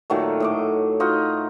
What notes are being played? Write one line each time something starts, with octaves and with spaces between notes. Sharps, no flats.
A#2 D#3 F#3 A3
A2 D#5 D6
D#4 F4 F#4 D#5